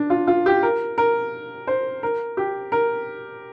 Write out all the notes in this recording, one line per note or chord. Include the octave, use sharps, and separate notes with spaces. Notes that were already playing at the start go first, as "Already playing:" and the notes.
Already playing: D4
F4
F4
G4
A#4
A#4
C5
A#4
G4
A#4